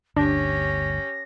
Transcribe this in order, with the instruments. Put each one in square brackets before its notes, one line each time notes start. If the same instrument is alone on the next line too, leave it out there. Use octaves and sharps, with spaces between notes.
[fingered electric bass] G1 D2 [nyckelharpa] C#4 G4 [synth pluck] D4 [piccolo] A#6